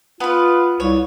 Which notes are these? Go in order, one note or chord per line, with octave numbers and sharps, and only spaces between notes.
B3 F4 B4
C2 C#5